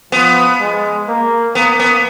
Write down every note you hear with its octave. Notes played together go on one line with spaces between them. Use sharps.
F3 B3
G#3
A#3
A#3 B3
B3